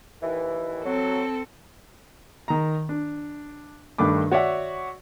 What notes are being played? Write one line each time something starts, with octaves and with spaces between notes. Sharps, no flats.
D#2 D#3 E3
F#3 C4 A4
D#3 A#5
D4
G2 D#3 A3 D4 B5 D6
F#4 C#5 D5 E5 F#5